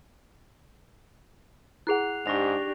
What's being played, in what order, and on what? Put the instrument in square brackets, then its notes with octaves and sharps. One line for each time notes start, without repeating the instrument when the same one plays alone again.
[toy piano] E4 G#4 F#5 [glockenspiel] F#6 C7 F7
[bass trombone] G#2 [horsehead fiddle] D4 G4 [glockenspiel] C#6 A#6 F7